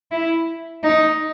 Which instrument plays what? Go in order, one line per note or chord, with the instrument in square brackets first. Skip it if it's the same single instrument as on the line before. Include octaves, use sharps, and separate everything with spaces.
[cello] E4
D#4